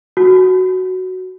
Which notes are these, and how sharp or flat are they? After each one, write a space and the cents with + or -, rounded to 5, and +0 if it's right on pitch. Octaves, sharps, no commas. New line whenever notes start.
F#4 +5